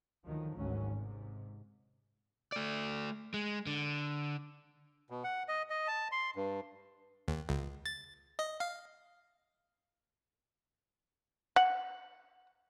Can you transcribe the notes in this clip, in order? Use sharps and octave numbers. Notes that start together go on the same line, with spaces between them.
D2 D#3 F3 F#3
G#1 D2 F#3 C#4
G#2 C3
A3 D5
G#3
D3
B2
F#5
D#5
D#5
A5
C6
G2
D#2
C#2
A6
D#5
F5
F#5